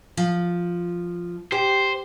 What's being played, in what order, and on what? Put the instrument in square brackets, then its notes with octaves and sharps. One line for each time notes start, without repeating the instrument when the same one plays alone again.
[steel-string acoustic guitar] F3
[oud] G4 [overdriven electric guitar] C5